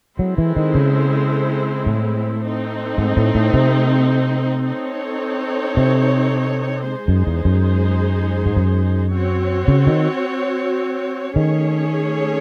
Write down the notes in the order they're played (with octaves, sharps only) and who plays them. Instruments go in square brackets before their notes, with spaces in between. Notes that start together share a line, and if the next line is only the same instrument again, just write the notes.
[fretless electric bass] F#3 [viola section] G#3 C4 E4 A4 C5
[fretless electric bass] E3
D#3
C#3
A2
[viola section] A3 C4 D#4
[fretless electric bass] G#2
A2
A2
C3
[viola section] C4 D#4 A4 C#5
[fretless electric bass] C3
[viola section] G#3 D#4 G#4 C5
[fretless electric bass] F#2
E2
F#2
G#2
F#2
[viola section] C4 F#4 C#5
[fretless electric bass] C#3
D#3
[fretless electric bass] D#3 [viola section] A3 C#4 G#4 C#5